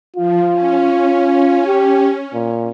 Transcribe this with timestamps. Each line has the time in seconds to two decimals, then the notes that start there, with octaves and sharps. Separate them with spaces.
0.17 F3 F4
0.52 C#4
1.67 G4
2.34 A#2